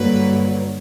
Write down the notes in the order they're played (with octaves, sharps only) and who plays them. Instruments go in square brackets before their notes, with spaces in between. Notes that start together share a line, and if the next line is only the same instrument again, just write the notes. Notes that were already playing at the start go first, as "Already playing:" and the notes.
Already playing: [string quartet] G2 D3 F#3 A#3 [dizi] B4